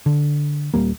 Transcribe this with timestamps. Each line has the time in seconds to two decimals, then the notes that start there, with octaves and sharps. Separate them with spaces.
0.06 D3
0.74 D#1 G2 G3 A#3